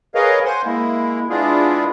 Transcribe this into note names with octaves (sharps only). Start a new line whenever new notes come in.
G#4 A#4 B4 C#5 D#5 F5
C5 F#5 G#5 C6
G#3 A#3 E4
G#3 B3 D4 E4 F4 G#4